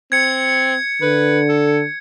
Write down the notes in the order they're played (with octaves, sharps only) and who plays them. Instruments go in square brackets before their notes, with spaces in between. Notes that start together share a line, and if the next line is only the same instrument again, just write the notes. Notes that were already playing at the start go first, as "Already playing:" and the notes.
[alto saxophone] C4 [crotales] G#6 C#7
[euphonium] D3 [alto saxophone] B4
[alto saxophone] A4